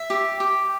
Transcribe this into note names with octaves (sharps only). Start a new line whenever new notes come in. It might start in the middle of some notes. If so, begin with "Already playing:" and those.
Already playing: E5
G4
G4